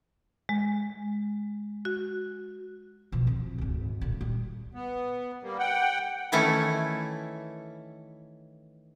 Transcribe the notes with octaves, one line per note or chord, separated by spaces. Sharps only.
G#3
F#4
B2 F3
F2
G#1 D2
A#2 D3
G3
B3
G3 A#3
F#5 G5
D#3 E3 A3 C#4 E4 A4